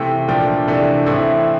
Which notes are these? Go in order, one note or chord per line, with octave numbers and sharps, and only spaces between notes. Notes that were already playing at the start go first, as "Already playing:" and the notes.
Already playing: C3 E3 A3 G5
A#2 F3 A3 D4 G5
C3 E3 A3 D4
A2 E3 A3 C4 E4